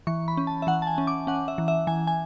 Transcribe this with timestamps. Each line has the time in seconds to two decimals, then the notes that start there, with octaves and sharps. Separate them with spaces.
0.07 E3 C#6
0.28 B5
0.37 C#4
0.47 A5
0.62 E5
0.67 E3 F#5
0.82 A5
0.87 G#5
0.98 C#4
1.07 D6
1.27 C#4 F#5
1.48 E5
1.58 E3
1.68 E5
1.87 E3 G#5
2.07 G#5